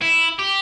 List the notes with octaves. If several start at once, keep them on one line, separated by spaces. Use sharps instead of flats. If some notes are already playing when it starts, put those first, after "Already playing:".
E4
G4